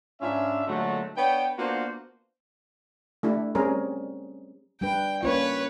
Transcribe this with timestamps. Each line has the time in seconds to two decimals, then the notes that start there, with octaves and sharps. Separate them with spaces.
0.21 G#2 C#4 D4 F4 E5
0.68 A#2 D3 F#3 G#3 A3 F#4
1.16 B3 D4 C#5 G5
1.57 A#3 B3 D4 F4 F#4 C5
3.23 A3 D4 E4 G4
3.55 G3 C4 C#4 G#4 A#4
4.81 G3 D4 B4 G5
5.23 A#3 C#4 F4 B4 C#5